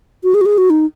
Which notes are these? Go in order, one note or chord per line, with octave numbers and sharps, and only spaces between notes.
F#4
G#4
F#4
G#4
F#4
D#4